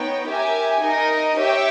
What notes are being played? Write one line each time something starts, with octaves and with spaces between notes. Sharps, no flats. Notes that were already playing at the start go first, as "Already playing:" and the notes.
Already playing: B3 D#4 C#5 G5
G4 A#4 E5 G#5
D#4 A#4 D#5
G4 C#5 E5 G5